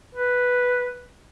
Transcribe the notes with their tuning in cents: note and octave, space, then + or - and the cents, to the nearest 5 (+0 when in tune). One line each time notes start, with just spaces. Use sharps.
B4 +0